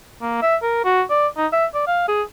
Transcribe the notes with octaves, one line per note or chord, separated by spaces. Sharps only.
A#3
E5
A#4
F#4
D5
D#4
E5
D5
F5
G#4